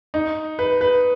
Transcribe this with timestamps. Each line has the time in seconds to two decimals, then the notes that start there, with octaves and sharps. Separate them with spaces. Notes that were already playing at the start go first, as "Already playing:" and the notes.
0.14 D#4
0.59 B4
0.81 B4